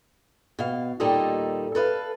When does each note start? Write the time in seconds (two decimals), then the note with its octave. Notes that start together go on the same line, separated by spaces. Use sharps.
0.59 B2 F5
1.00 D#2 A#2 G3 D#4 A4 D#5
1.75 A4 B4 D#5 F5